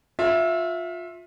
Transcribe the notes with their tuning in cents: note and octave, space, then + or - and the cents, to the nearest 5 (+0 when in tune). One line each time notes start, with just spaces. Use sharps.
F4 +25 E5 +0